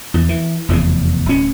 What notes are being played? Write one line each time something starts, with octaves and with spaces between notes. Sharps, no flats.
E2
E3
F1 E2 C#3
D1 C#4